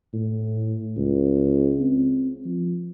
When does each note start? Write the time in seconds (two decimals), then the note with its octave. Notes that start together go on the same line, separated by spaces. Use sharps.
0.13 A2
0.97 C#2
1.80 C4
2.45 F3